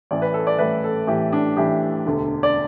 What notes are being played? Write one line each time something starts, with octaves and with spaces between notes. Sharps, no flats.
A1 A2 E3 D5
B4
A4
D5
A1 A2 E3 B4
A4
A1 A2 E3 G4
D4
A1 A2 E3 G4
E1 D2 D3
D5